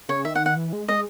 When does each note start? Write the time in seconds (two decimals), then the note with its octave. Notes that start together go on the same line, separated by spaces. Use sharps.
0.09 C#3 C#5
0.25 D#3 E5
0.35 F#5
0.46 F#5
0.56 E3
0.73 G#3
0.88 G#3 D#5